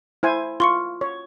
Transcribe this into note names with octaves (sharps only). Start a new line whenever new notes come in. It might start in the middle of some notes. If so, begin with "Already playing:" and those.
E4 C5 G#5
F4 C6 C#6 C#7
C#5